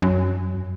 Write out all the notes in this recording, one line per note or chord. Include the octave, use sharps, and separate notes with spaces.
F#2